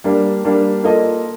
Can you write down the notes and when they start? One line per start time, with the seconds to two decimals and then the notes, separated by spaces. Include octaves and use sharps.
0.04 G3 A#3 D4
0.45 G3 A#3 D4
0.84 A#3 F4 A4 D#5